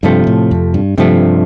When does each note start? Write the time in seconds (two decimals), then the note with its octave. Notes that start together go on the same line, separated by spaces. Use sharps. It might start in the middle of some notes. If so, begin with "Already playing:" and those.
0.03 G2 C3 F3 A3
0.27 A2
0.51 F2
0.74 G2
0.98 G2 C3 F3 A3